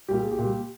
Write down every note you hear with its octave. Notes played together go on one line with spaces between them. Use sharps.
A#2 G3 G4
G#4
G4
A#2 G3